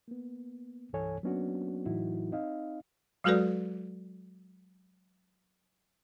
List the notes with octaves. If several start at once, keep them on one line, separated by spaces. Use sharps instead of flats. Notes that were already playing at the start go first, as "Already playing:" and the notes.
A#3 B3
C2 G2 E3 A4 C#5 G#5
F#3 A#3 B3 C#4 D4 F#4
A2 E3 F#3 D#4 E4 F#4
C4 D#4 D#5 F5
F#3 G#3 F#4 A4 B4 D5